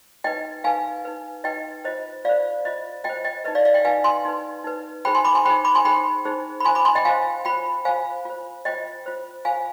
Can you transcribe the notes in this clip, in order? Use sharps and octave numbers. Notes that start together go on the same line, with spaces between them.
D#4 B4 D#5 G5
D#4 B4 F5 G#5
D#4 B4
D#4 B4 D#5 G5
F4 C5 D#5
F4 C5 D5 F5
F4 C5 D#5
F4 C5 D#5 G5
D#5 G5
D#4 B4 D#5
D5 F5
D5 F5
D#5 G5
D#4 B4 F5 G#5
G#5 C6
D#4 B4
D#4 B4
D#4 G#4 C5 G5 B5
G#5 C6
B5 D6
G#5 C6
D#4 G#4 C5 G5 B5
B5 D6
G#5 C6
D#4 G#4 C5 G5 B5
D#4 G#4 C5
B5
F4 C5 G#5 C6
B5 D6
G#5 C6
D#5 G5
F4 C5 F5 G#5
F4 C5 G5 B5
F4 C5 F5 G#5
F4 C5
F4 C5 D#5 G5
F4 C5
F4 C5 F5 G#5